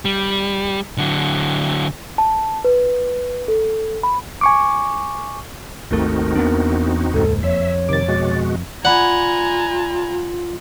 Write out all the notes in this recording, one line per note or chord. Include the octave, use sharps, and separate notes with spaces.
G3
D3 F#3
A5
B4
A4
B5
G#5 C#6 D6
G#1 D#2 A3 C4 D#4 F#4 A#4
E2 E3 A#3 B3 D4
C#2 G#2 A4
F2 C#5 E5
C3 D#3 D6 A6
B2 G#3 F#4
F4 D5 F#5 G#5 A#5 B5